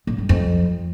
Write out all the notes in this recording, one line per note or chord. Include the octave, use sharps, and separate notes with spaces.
A#2
G2
F2